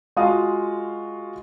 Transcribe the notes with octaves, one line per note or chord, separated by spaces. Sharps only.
G#3 F4 F#4 F5 D#6